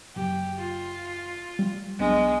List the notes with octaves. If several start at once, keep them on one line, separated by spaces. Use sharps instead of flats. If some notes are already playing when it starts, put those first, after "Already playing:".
F#1 G4
F4
G3
B1 G#3 B3 D4